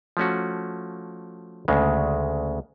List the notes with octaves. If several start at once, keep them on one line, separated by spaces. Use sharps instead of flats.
F3 A3 C#4 F#4
D2 C#3 G#3